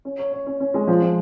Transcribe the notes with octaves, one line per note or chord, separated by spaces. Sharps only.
C#4
C#5
C#5
C#4
C#4
G#3
F3
F3